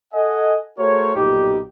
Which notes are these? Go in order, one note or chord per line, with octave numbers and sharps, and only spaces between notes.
A4 D#5 F#5 G#5
A3 F#4 G#4 A#4 C5 C#5
B1 G2 A#2 G3 D#4 G4